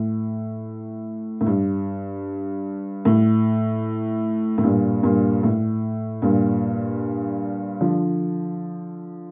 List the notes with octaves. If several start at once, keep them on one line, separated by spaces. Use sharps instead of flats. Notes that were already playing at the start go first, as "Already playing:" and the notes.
Already playing: A2
A2
G2
A2
A2
G2 A#2
G2 A#2
A2
G2 A#2
D3 F3